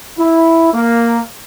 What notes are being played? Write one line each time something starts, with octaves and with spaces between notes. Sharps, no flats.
E4
A#3